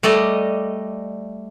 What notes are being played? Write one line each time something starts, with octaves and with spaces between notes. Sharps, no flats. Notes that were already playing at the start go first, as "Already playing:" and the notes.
G3 A3 D5 D#5